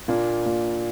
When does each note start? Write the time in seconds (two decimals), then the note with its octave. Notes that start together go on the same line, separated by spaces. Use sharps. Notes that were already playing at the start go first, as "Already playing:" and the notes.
0.08 A#2 A#3 D4
0.46 A#2